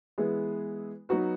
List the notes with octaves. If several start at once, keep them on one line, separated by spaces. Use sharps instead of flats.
E3 G#3 B3 E4 G#4
F#3 B3 D#4 F#4 B4